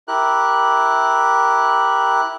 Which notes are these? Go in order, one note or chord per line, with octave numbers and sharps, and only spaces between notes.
E4 G4 A#4 F#6